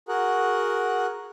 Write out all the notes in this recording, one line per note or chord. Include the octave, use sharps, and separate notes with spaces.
F#4 G#4 A#4 F#5